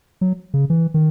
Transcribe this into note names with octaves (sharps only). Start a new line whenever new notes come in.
F#3
C#3
E3
D#3